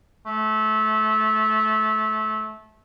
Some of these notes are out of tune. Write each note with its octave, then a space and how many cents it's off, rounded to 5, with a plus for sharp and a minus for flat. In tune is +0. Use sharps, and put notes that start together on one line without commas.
A3 -20